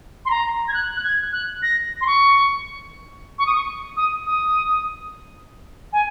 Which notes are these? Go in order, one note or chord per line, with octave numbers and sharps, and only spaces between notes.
C6
A#5
G#6
F#6
F#6
G#6
F#6
A#6
C6
C#6
C#6
D#6
C#6
D#6
D#6
G#5